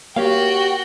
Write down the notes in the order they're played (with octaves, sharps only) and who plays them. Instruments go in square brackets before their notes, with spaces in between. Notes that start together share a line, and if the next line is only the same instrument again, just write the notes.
[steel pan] A#3 [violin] F#4 G5 [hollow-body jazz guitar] G4 C#5 F5